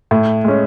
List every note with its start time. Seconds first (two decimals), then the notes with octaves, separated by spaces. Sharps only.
0.11 A2
0.44 G#3 C#4